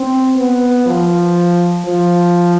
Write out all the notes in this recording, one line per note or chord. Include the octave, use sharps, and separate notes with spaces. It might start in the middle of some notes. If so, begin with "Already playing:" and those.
Already playing: C4
B3
F3
F3